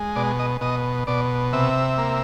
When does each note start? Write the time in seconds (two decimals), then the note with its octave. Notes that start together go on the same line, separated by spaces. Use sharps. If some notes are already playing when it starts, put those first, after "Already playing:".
Already playing: G#3
0.16 B2 D5
0.39 D#5
0.61 B2 D#5
1.07 B2 D5
1.53 C3 E5
1.98 A#3